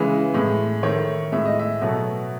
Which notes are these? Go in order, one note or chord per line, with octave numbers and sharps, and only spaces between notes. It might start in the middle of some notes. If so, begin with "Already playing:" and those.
Already playing: C#3 E3 G#3 B4
A2 G#3
D#3 A3 C#5
A2 G#3 E5
D#5
E5
B2 F#3 A3